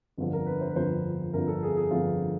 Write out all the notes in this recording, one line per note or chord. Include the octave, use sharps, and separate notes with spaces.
G1 F2 D3 F3
A#4
B4
C5
B4
G1 F2 D3 F3 C5
G1 F2 D3 F3 A#4
A4
G#4
G#4
G1 F2 D3 F3 F4